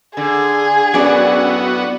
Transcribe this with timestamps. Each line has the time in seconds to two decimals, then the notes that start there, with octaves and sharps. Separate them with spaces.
0.17 D3 G#4
0.94 F#2 A2 B3 D4 F#4 D5